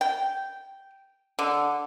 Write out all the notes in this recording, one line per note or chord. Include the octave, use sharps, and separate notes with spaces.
G5
D3